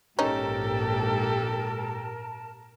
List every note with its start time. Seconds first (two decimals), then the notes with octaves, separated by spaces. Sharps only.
0.19 A#1 G#2 C#4 D#4 G4 A4 A#4 A5